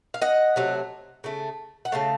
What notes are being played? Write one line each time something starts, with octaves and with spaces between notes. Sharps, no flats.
F5
D#5 F#5
C3 F#3 A3
C#3 A3
F#5
C#3 A3 F5 A5